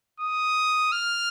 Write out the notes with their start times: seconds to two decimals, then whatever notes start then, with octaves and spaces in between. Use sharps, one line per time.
0.20 D#6
0.92 F6